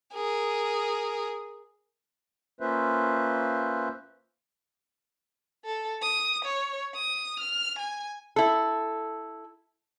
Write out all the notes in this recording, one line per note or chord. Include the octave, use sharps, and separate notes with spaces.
G#4 A#4
A#3 C#4 F4 B4 C5 E5
A4
D#6
C#5
D#6
F6
G#5
E4 A4